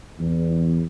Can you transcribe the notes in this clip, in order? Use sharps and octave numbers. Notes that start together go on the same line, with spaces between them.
E2